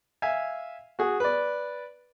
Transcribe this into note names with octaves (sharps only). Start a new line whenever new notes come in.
E5 F5 G#5
F#4 G#4
B4 D5